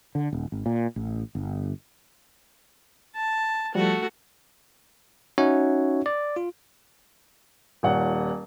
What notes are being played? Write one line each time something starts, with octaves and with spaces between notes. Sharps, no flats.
D3
D#1
G#1
A#2
A1
G1
A5
F3 G3 A3 F#4
C#4 D#4 F#4 C#5 E5 F#5
D5
F4
D#1 A#2 C#5 F#5